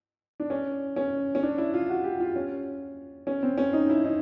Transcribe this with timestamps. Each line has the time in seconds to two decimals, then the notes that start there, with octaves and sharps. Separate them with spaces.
0.40 D4
0.50 C#4
0.96 C#4
1.35 C#4
1.43 D4
1.58 E4
1.74 F4
1.89 F#4
2.04 G4
2.20 F4
2.36 C#4
3.27 C#4
3.43 C4
3.58 C#4
3.73 D#4
3.90 E4
4.05 D#4